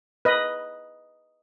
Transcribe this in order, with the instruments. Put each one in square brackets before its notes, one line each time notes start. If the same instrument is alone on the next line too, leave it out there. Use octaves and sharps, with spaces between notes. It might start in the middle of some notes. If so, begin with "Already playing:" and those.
[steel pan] B4 D#5